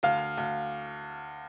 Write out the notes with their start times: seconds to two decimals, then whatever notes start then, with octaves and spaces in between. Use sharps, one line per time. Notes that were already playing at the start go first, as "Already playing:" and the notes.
0.03 D2 F5
0.38 D2